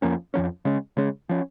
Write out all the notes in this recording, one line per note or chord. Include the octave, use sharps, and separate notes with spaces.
F2 F3 A#3 C#4
F2 F3 A#3 C#4
C#3 G#3 C#4
C#3 G#3 C#4
F3 C#4